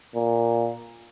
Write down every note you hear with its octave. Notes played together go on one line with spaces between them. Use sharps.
A#2